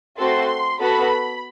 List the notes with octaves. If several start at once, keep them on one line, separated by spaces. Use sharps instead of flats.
A3 C4 F#4 A4 C6
B3 F#4 A4 B5